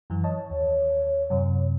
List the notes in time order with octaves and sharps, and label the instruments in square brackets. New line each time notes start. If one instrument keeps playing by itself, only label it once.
[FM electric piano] F#2 E3
C#5 D#5 A5
[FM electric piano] D#2 [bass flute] C#5
[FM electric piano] F#2 C3